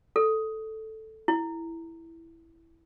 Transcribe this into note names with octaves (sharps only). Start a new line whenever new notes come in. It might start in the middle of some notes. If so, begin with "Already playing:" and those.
A4
E4